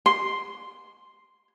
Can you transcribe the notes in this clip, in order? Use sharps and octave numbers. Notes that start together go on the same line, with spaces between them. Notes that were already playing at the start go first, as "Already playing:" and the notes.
C6